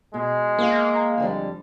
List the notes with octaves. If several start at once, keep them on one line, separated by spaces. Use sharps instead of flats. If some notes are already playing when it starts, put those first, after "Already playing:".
B2 G#3
A#3 G#4 F5
F2 D3 G3